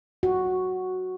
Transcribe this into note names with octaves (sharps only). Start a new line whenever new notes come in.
F#4